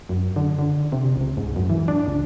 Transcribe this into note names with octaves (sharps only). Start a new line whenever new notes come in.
F#2
D3
D3
C3
C#2
G#2
F#2
E3
D4
C#2